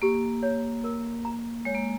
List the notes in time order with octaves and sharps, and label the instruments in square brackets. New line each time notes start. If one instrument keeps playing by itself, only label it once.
[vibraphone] A#3 [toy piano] G4
[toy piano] C#5
A#4
A#5
[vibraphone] G#3 [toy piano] C#5
[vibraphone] A#3